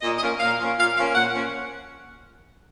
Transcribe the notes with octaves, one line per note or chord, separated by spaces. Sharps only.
A#2 D#5
D#5
F3 A#3 C#4 F5
A#2 F5
F3 A#3 C#4
A#2 F5
F3 A#3 C#4 F5
A#2 F#5
F3 A#3 C#4